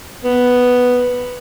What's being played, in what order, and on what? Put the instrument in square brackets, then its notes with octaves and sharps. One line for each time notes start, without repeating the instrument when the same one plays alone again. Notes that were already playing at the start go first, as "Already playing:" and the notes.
[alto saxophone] B3